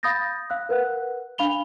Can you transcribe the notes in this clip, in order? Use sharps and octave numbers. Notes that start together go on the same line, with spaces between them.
F5 B5 D#6 G6 A6 A#6
F5 E6 F#6
A#4 B4 F#5 F#6
D4 F5 B5 F7 G7